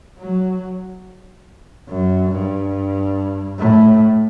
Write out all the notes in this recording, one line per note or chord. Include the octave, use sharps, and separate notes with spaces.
F#3
F#2
G2
A2